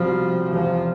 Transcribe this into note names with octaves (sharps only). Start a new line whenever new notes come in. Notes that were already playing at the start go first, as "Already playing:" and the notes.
Already playing: C2 B2 F3 G3 C4
F1 E2 C3 F3